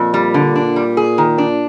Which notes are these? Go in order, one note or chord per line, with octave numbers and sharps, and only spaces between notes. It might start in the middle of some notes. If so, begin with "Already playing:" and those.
Already playing: F2 A#2
G3
D3
D4
G3
G#4
D#3
D4